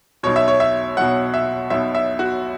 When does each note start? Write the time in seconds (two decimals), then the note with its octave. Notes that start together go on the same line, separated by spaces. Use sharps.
0.23 B1 B2 C#5
0.36 E5
0.48 C#5
0.60 E5
0.97 B1 B2 F#5
1.34 E5
1.70 B1 B2 E5
1.95 E5
2.19 F#4